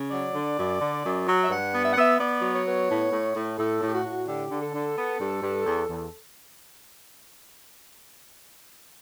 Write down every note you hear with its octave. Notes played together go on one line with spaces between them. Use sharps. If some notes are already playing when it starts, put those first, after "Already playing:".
Already playing: C#3
F#3 D5
D3
F#2
D3
F#2
F#3
E5
G2 F#5
B3
E5
F#5
B3 E5
B3 D5
F#3
C#5
B3
A2
A2
A2
A2 A4
A2
G4
F#4
A2
D3 G4
D3
A4
D3
B3
G2
G2
E2
E2